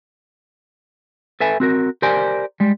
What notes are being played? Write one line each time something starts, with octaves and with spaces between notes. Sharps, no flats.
A4 B4 E5 G#5
C4 F#4 A#4
G4 A#4 C5 D5 G#5
G3 G#3